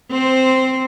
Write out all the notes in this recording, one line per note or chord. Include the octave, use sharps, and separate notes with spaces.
C4 C5